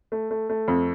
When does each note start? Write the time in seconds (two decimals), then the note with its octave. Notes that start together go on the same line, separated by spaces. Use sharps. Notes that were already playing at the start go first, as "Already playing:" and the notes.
0.12 A3
0.31 A3
0.50 A3
0.68 F2